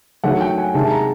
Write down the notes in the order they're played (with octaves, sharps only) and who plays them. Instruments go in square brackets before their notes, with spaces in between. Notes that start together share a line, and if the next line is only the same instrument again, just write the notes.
[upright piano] D#3 F#3 A3 F#5
G5
G#5
C3 D#3 G#3 A5
A5
A#5